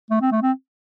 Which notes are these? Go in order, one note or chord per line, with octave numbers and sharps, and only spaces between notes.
A3
C4
A3
C4